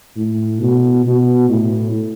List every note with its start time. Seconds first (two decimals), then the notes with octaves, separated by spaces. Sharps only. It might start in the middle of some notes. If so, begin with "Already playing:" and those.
0.16 A2
0.61 B2
1.04 B2
1.49 A2